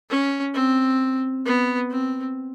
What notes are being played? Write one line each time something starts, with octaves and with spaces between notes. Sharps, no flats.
C#4
C4
B3
C4